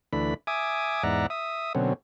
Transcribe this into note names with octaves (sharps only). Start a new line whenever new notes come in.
D2 E3 A3 D4 B5
E5 G#5 D6 D#6
E2 G#2 D5 E5 F#5 A#5
E5 D#6
B2 D3 F#3 C4 C#4